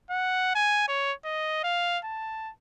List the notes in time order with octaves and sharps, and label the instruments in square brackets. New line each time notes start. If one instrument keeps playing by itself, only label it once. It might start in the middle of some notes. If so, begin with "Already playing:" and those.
[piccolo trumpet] F#5
G#5
C#5
D#5
F5
A5